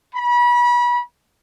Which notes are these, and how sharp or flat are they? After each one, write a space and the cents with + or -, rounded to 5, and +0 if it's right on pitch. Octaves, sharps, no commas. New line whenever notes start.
B5 -30